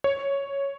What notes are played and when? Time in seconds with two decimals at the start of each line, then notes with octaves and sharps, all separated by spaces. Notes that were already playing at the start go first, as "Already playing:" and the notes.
0.04 C#5